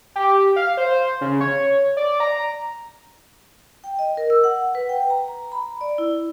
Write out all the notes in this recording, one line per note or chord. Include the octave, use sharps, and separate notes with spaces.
G4
F5
C5
C#3
C#5
D5
A#5
G5
D#5
A#4
E6
F#5
B4
G5
A#5
A#5
B5
D5
E4